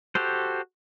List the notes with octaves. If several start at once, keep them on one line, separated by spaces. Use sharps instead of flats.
F#4 G4 A4 C5